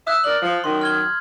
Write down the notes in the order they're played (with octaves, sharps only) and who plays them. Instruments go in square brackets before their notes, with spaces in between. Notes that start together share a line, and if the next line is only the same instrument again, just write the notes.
[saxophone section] E5 [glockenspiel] D#6 F#6
[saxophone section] A#4 D5 [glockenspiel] F#7
[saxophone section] F3
[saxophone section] F#2 D#3 [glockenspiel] C6
[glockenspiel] F6 G#6 G7